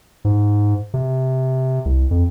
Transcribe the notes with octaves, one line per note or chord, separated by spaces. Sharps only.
G#2
C3
C2
F2